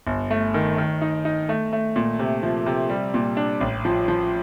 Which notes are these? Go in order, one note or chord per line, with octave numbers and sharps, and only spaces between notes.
G1
A3
D#3
D#3
D#4
D#4
A3
A3
A#2
C3
F3
C3
G3
A#2
D4
A1
F3
F3